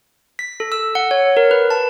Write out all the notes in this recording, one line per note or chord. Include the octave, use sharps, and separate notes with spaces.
B6
A4
E6
F#5
C#5
A#4
B4
A5